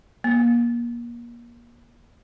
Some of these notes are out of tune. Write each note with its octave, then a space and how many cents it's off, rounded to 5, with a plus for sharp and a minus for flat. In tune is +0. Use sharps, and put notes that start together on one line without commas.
A#3 +30